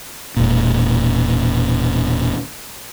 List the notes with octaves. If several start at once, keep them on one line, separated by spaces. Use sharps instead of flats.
E1 A#2